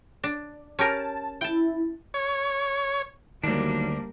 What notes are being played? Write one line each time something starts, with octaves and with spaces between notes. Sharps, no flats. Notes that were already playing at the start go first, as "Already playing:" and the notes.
D4
C#4 G4 A#4 A5
E4 G5 A5
C#5
D2 D#3 F#3 G3 A#3 D4